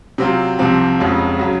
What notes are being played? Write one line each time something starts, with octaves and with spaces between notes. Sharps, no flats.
C3 F#3 C4 F4
C2 C3 F3 C4
F1 F2 C#3 G#3
C#3 F#3